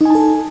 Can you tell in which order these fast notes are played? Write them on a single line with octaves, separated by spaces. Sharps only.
D#4 G#5 A5 A4